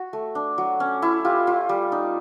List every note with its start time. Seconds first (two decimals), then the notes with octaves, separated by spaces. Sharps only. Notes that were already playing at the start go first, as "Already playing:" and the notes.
Already playing: F#4
0.13 A3
0.35 D4
0.58 F#3
0.80 C#4
1.02 E4
1.25 F4 G4
1.47 F4
1.69 G3
1.92 D#4